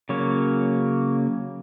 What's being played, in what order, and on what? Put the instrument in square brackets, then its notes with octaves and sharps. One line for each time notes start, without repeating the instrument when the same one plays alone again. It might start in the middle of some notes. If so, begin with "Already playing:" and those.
[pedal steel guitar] C#3 F#3 A#3 C#5